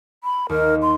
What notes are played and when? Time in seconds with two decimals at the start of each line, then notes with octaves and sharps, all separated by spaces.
0.24 B5
0.49 D#2 A#4
0.82 C6